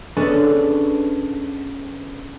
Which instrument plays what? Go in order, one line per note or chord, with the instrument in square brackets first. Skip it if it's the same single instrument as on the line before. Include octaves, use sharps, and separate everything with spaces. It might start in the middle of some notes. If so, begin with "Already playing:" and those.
[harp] B3 C#4 D4 G#4 A4 B4